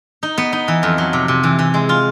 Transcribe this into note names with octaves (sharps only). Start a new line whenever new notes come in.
D#4
B3
D#4
E3
F2
F#3
C3
C3
E3
E3
G#3
F4